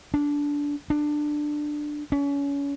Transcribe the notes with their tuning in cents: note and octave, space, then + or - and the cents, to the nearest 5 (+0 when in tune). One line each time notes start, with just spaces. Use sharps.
D4 -15
D4 +15
C#4 +30